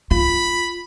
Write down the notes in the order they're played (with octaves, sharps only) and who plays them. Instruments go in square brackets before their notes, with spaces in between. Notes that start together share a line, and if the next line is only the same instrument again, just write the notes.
[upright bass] F4 [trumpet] B5